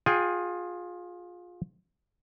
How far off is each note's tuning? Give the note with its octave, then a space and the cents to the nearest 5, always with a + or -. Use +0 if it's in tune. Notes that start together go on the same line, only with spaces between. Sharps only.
F4 +25 G#4 +0 G5 +0